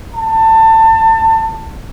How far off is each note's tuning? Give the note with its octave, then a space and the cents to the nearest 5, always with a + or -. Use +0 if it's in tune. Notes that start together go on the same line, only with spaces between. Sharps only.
A5 +25